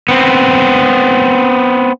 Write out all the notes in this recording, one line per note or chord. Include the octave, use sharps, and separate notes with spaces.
B3 C4